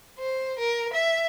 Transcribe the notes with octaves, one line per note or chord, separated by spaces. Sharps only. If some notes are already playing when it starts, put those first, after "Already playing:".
C5
A#4
E5